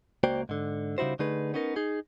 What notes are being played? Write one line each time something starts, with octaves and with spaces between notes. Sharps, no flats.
C#2 A#3 F#4 C5 D5 G5
G#2 D3
C#3 G3 D#4 E4 F#4 C5
D3 A3 D#4 G#4 B4
B3 C#4 D#4 A#4
D#4 G#4